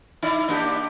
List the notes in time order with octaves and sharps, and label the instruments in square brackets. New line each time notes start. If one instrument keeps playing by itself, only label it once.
[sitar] D#4 E4 D5
A#3 D4 G4